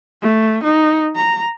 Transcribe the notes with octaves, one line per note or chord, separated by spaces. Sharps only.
A3
D#4
A#5